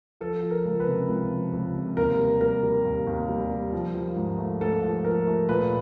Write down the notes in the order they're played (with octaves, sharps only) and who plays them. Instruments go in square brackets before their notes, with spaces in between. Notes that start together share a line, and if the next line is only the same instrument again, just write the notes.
[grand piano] F3 A4
F3
A#4
C#2
B4
C3
C#2
F3
C#2
C3
D#2 A#4
G3
G3 A#4
G3
D#2
D#2
G3
G3
F3
F3
G#2
A3
G#2 A4
F3
F3 A#4
A3
A#2 B4